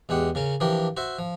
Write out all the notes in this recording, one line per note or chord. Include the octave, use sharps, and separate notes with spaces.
E2 G#3 G4 F#5
C#3 C#4 A#4
E3 F3 D4 G4 A#4
F#4 C5 E5
F3